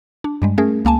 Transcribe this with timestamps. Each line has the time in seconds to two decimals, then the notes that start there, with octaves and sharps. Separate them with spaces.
0.24 D4
0.42 G2 G3 G#3
0.58 A3 C#4 G#4 A#4
0.85 C#2 A#3 G#5 A5